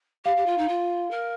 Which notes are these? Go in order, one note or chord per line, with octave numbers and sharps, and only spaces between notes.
G4 F5
G4
F4
D#4
F4
A#4